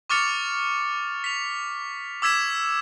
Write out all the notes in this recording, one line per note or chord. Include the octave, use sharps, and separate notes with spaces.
C#6 D6 F6 A6 C#7 F7
B6 F7
D6 E6 G#6 B6 E7